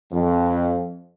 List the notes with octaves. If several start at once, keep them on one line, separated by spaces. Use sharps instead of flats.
F2